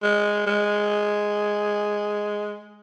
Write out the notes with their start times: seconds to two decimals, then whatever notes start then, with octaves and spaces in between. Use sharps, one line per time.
0.03 G#3
0.47 G#3